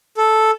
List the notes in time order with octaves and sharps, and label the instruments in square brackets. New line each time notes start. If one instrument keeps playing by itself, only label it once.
[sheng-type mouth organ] A4